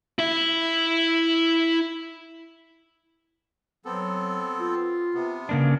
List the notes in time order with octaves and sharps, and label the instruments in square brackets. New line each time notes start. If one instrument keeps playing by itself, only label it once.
[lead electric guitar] E4 E5
[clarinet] F#3 [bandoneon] B3 C4 A4
[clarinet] F4
[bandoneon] C3 B3
[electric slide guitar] C#3 A#3 D4